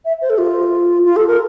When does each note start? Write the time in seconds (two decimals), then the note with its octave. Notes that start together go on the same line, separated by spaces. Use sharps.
0.05 E5
0.22 C5
0.30 A4
0.38 F4
1.05 F4
1.16 A4
1.28 A#4